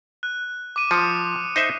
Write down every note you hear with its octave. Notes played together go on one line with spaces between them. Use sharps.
F#6
D6 D#7
F3 D6 D#6 C#7
D#4 C5 E5